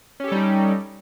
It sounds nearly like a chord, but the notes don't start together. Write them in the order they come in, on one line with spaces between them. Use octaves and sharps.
C#4 G4 A4 G3 D#4